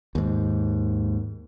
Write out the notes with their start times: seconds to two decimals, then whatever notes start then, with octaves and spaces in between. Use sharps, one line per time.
0.15 D#2 G#2